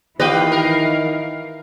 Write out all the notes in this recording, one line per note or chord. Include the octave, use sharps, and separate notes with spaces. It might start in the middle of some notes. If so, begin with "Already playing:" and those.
D#3 E3 F4 G4 B4 D#5 F5 G5
A#4